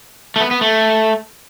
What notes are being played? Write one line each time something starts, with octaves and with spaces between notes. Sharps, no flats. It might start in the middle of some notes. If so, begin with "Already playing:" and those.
A3
B3
B3
A3